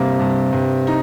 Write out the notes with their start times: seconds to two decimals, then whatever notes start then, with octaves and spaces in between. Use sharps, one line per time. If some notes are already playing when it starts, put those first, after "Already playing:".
Already playing: G2 C3 A#3
0.20 G2
0.53 G2
0.87 D#4